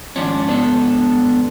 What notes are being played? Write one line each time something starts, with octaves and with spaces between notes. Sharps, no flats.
D#2 G#2 F3 C#4 D4
B3 D4 A4